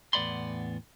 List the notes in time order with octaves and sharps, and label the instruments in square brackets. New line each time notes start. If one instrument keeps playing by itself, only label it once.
[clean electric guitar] E2 A2 B3 D5 B5 C6